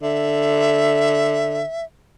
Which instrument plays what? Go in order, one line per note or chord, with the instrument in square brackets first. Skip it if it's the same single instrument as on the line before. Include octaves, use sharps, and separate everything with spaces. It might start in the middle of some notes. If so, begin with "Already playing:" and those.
[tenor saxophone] D3 [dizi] E5